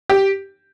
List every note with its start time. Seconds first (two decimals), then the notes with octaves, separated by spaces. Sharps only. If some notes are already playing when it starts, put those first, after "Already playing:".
0.09 G4